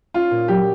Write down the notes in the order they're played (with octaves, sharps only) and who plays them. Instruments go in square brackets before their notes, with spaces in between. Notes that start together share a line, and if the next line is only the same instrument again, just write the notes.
[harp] C#4 [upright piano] F4
[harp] A#2
[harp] F#3 [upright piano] G4